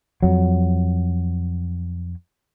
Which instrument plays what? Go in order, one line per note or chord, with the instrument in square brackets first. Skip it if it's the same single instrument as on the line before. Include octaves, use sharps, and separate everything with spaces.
[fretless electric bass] F2 F#3